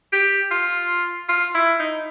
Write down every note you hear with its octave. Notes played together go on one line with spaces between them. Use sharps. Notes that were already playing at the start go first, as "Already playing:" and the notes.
G4
F4
F4
E4
D#4